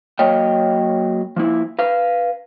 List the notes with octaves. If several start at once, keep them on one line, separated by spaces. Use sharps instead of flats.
F#3 A#3 C#5 D#5 G5
F3 A#3 E4
B4 F5